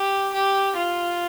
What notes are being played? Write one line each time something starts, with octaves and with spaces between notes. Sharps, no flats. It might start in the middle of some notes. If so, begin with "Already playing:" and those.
Already playing: G4
G4
F4